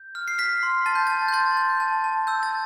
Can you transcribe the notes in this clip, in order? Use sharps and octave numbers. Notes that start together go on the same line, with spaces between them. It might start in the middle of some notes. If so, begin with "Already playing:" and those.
Already playing: G6
F6
C7
F6 B6
C6
A5 A6
G6
A5 A6
G6
C6 A6
G6
A5
A5
E6 G6
A6